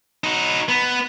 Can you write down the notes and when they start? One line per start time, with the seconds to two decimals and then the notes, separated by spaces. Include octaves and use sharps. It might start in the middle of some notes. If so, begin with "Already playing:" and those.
0.24 D#4 F#4
0.69 B3